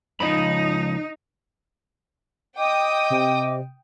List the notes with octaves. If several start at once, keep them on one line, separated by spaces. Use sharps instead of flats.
C#2 F3 D#4 B5
D#5 G5 D6 D#6
C3